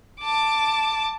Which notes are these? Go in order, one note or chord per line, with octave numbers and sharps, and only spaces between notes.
A5 D6